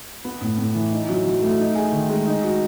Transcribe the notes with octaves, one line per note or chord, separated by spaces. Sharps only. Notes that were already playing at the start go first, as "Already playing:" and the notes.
B3
A2
A2
E3
D#4
F#3
F#3
A3
D#4
G#4
D#3
G#3
D#4
F#4